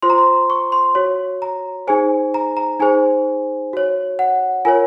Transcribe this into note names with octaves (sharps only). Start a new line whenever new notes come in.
F4 C5 C6
A#5
C6
C#6
C6
F#4 C#5
A#5
D#4 G#4 C5 G#5
A#5
A#5
D#4 G#4 C5 G#5
F#4 C#5
F#5
F4 A#4 C#5 G#5